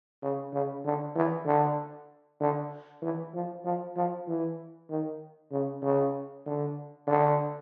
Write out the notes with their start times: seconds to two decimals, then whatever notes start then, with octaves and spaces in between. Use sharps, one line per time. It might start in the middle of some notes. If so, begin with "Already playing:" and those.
0.22 C#3
0.53 C#3
0.84 D3
1.15 E3
1.46 D3
2.40 D3
3.02 E3
3.34 F3
3.64 F3
3.96 F3
4.28 E3
4.89 D#3
5.51 C#3
5.82 C#3
6.46 D3
7.07 D3